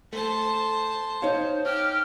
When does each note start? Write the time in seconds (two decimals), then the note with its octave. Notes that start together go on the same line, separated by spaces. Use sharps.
0.13 A3 C5 A5
1.22 D#4 C5 C#5 F5
1.65 G4 F6